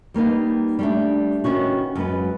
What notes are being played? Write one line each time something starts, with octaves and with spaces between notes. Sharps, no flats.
G3 A#3 B3 D#4
G3 A3 D4
D#3 B3 C#4 F#4
F#2 G#3 B3 B4